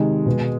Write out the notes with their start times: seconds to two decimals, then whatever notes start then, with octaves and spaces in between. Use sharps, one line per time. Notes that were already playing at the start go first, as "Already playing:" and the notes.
Already playing: C3 D#3 G#3
0.26 B2